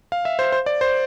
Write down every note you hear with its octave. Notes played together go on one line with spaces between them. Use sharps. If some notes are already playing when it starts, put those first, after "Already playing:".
F5
E5
C5
C5
D5
C5